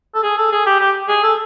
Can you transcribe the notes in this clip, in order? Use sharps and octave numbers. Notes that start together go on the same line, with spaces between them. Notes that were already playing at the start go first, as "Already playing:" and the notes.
A4
G#4
A4
G#4
G4
G4
G#4
A4